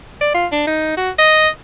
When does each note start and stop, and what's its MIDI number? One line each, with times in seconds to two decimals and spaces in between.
0.21 0.29 74
0.34 0.46 65
0.52 0.62 62
0.67 0.93 63
0.97 1.10 66
1.18 1.48 75